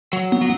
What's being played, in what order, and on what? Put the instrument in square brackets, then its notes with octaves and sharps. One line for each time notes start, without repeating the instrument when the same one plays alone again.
[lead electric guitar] F#3
[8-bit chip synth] B3
[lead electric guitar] F#3